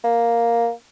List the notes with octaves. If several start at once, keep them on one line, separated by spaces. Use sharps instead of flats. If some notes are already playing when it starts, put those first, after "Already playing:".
A#3